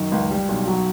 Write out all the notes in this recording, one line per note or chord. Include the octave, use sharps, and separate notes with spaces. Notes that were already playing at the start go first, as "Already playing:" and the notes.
Already playing: F#2 D#3
C#2
G3
B1
F#3